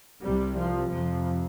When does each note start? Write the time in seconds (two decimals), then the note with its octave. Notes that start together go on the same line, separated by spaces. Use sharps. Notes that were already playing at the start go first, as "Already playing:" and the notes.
0.23 C2 C3 G3
0.58 F3
0.91 F2 C3 F3